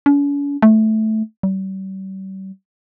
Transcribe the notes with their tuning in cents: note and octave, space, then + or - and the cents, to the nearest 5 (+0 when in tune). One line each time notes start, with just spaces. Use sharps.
C#4 +45
A3 -10
G3 -40